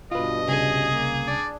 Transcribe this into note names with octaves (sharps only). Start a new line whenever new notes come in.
G2 B2 F4 B4 D#5
C2 C#3 G#4
A#3
D4 D5